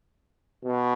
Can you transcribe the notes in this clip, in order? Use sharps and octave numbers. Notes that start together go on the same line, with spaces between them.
B2